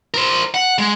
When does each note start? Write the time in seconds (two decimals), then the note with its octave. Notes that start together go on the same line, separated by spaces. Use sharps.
0.14 A#4 C5
0.54 F#5
0.78 G#3